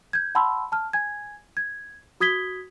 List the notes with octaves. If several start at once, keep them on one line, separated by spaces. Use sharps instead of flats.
G6 G#6
F#5 A5 B5 C6 E6
A5 F6
G#5 G#6
G#6
F#4 D#6 G#6 B6 G7